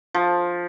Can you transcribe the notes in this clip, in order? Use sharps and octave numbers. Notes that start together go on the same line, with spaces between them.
F3